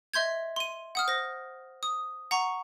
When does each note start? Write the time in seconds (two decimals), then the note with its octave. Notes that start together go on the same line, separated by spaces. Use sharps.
0.14 D#5 E5 C6 G6 G#6
0.56 C6 D#7
0.95 F#5 D#6 F6
1.08 C5 A#6
1.83 D#6
2.31 F#5 A#5 C#6